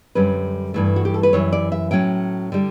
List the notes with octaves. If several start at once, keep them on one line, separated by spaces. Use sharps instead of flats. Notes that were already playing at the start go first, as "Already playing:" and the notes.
F#2 D3 G3 C#4 B4
G2 E3 A3
F#4
G4
A4
B4
F#2 E3 G3 C#5
D5
E5
A2 F#3 C#4 G5
D3 G3